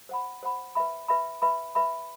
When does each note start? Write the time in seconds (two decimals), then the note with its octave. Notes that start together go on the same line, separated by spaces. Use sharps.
0.09 C5 F#5 B5
0.43 C5 F#5 B5
0.75 B4 E5 B5
1.08 B4 E5 B5
1.42 B4 E5 B5
1.75 B4 E5 B5